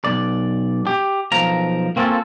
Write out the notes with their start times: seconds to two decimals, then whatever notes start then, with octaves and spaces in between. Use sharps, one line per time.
0.04 B1 D5
0.87 G4
1.32 B1 F3 A#4 A#5
1.97 A#3 C4 C#4 F4 A4